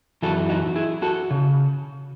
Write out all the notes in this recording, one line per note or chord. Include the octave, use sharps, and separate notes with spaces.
F#2 E3 F#4 A4
D#4 F#4
E4 G#4
F#4 A4
C#3